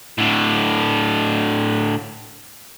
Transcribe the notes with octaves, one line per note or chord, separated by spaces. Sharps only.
A2 D3